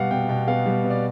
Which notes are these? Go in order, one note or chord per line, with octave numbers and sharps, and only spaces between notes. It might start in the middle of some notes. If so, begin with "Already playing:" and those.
Already playing: B2 G3 B3 F5 F#5
B2 G5
B2 G5
B3 F5
G3
B2
D5